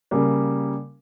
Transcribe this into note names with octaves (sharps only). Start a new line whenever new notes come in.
C#3 G3 A#3